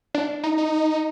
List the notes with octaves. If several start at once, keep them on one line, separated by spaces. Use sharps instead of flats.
D4
D#4
D#4